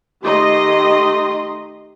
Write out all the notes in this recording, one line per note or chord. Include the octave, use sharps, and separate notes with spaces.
D#3 A3 G4 D#5 C6